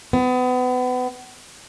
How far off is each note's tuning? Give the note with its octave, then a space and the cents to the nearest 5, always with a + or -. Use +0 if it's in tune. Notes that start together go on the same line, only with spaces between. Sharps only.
B3 +30